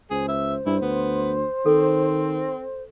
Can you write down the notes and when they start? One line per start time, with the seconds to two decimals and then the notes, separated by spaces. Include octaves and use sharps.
0.11 C#2 G#4 C5
0.28 E5
0.66 G2 E4
0.82 D2 B3
1.66 D#3 C4 A4